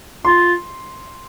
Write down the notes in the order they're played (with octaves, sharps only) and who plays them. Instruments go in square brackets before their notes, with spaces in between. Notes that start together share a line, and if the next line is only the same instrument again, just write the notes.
[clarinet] F4 [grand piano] C6